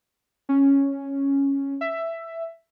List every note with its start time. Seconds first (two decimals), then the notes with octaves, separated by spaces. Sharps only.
0.49 C#4
1.81 E5